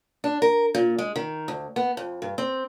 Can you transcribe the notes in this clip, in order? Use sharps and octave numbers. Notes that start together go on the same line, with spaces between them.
D4
A#4
A#2
G#3
D#3
D2
B3
F2
G2
C4